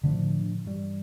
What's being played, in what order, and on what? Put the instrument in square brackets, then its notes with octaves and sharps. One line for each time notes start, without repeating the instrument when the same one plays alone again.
[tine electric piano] A2 F3 A3 D4 [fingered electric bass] D3
[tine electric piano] G2 E3 G3